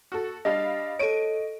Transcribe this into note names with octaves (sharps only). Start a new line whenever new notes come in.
F#4 A4
G3 D4 D#5 F5
A4 C#5 D7 D#7